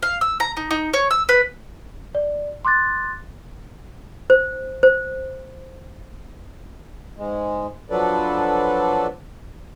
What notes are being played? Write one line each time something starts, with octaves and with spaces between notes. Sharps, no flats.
F5
E6
A#5
D#4
D#4
C#5
E6
B4
D5
C6 D6 F#6 A6
C5
C5
G#2 G#3
F3 F#3 D4 A4 B4 D5